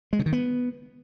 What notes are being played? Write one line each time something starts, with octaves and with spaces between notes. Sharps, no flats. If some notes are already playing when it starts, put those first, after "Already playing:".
G#3
C#3
D#3
B3